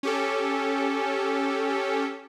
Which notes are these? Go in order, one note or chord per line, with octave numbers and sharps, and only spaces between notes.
C#4 G4 A4